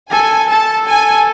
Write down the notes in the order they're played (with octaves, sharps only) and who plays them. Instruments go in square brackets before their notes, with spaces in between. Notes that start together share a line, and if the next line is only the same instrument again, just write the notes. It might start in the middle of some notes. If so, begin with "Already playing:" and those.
[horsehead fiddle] A4 [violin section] G#5
[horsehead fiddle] A4 [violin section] A5
[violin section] G#5